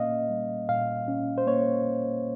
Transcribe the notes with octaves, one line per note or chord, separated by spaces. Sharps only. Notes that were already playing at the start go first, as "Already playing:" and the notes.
Already playing: A#2 A#3 C#4 D#5 F5
G3
A#2 F5
C#4
C5
A#3 C#5